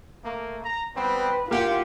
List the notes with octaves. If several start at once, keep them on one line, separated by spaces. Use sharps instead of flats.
A3 A#3
A#5
G3 B3 C4 B4
A#3 F4 G4 F#5